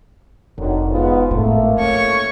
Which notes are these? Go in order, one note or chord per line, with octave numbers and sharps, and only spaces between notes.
F1 D3 D#3 F#3
G#2 B3 F4
G#1 A2 A3 A#3
C#4 C#5 C#6